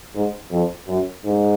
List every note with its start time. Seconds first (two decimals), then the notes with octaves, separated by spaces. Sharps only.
0.15 G#2
0.51 F2
0.87 F#2
1.24 G#2